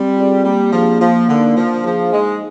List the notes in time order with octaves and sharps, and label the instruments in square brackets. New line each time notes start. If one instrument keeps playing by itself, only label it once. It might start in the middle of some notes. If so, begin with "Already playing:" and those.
Already playing: [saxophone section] G3 [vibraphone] C4
[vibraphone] F4 G#4 D5
[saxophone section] G3 [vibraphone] A#3
[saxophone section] F3 [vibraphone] D4 G#4
[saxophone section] F3 [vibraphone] A#3
[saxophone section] D3 [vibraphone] D#4 A#4 F5
[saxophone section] F3 [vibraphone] D4
[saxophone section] F3 [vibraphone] G#4 C5 F5
[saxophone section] G#3 [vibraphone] D#4